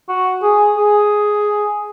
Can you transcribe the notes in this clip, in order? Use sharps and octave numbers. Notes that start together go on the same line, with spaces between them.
F#4
G#4
G#4